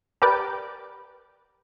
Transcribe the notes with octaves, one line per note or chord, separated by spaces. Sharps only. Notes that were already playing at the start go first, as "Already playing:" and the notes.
G4 A#4 B4 D5 G5